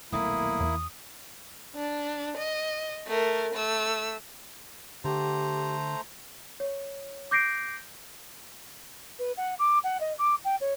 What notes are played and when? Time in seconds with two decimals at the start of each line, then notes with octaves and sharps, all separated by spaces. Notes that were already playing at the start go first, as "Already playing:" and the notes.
0.12 D#1 B1 A3 A#3 E4 D#6
0.60 E2
1.76 D4
2.37 D#5
3.07 A3 A#4
3.54 A3 E6
5.04 D3 A3 G4 C5 A#5
6.60 C#5
7.31 D6 G6 A#6 C7 D7
9.19 B4
9.37 F#5
9.59 D6
9.83 F#5
10.00 D#5
10.18 D6
10.44 G5
10.60 C#5